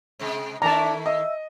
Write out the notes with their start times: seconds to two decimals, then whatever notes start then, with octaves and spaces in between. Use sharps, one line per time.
0.19 C3 G#3 C4
0.62 D#3 A3 D4 E4 A5 A#5
1.06 D#5 E5